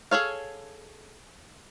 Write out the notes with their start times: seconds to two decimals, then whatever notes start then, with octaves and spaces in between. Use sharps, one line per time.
0.11 G#4 A4 C#5 F5